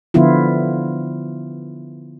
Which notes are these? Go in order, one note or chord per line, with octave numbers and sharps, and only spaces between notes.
D3 F3 B3 E4 F4